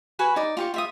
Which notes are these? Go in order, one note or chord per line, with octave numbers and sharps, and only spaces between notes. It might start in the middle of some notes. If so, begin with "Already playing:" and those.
F#4 B4 G#5
D#4 D5
F4 G4 C#6
F4 E5 D#6